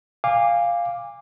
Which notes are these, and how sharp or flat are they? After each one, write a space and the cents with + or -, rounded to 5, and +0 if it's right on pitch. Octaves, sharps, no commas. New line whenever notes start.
F5 +0 G#5 -35 D6 +0